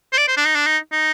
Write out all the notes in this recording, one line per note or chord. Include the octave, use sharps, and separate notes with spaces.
C5
D5
C5
D4
D#4
D4
D#4
D#4